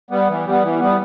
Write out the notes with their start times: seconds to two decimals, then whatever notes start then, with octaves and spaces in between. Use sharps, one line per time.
0.11 G3 B3
0.28 E3
0.45 G3 B3
0.63 E3
0.80 G3 B3